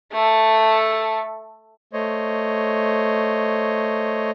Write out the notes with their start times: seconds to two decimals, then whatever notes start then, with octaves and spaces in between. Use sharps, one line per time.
0.13 A3 A4
1.93 A3 C5 C#5 D#5